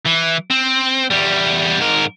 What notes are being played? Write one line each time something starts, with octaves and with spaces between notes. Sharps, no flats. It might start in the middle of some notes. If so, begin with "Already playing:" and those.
E3
C4
E2 G3
G#2 A#4